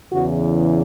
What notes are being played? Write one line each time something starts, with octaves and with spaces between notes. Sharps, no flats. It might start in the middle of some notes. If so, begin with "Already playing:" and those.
E2 C#3 E3 F#4